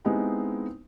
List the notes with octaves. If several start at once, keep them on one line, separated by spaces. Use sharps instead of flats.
G#3 B3 C4 D#4 E4 G4